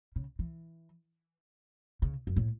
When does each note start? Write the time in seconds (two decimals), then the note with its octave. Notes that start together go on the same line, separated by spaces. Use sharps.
0.16 C#3
0.39 E3
2.02 C#3
2.27 F#2
2.36 A2